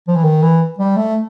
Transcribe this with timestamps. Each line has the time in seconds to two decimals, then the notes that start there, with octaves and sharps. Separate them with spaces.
0.08 F3
0.16 E3
0.23 D#3
0.43 E3
0.79 G3
0.96 A3